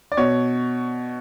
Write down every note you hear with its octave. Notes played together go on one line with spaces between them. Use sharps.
D5
B2 C#5